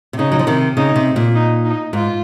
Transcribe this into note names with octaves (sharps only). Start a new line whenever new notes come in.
C3
C#3 D#4
F#3
F3
C3 D#3
C#3 D#4
C3
A#2
D#4
D#4
G#2 F4